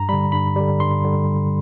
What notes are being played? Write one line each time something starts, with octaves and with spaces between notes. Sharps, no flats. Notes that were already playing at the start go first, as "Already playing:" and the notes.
Already playing: G2 A#5
D3 G3 B5
G2 B5
D3 G3
G2 C6
D3 G3